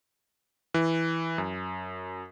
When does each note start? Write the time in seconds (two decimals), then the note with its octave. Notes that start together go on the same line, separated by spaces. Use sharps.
0.74 E3
1.38 F#2